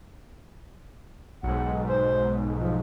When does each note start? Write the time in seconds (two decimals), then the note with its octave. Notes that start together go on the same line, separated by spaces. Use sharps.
1.43 B1 G#2 F#5
1.89 C5
2.60 F3